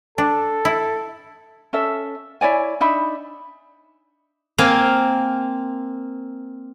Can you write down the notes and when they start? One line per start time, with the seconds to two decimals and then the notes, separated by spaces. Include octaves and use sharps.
0.18 D4 A4
0.65 E4
1.73 C#4 A4 E5
2.41 E4 C#5 D5 G#5
2.81 D4 D#4 E5 B5
4.58 A#3 C4 F5 G#5